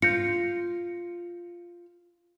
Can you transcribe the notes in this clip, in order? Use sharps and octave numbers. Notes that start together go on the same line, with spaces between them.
F4 G6 A#6 C#7